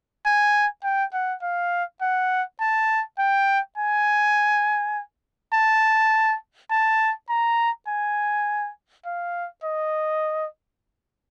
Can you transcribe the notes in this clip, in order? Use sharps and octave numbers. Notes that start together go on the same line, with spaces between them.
G#5
G5
F#5
F5
F#5
A5
G5
G#5
A5
A5
A#5
G#5
F5
D#5